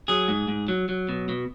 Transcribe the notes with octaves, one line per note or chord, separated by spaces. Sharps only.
F#3 G#4
G#2
G#2
F#3
F#3
B2
B2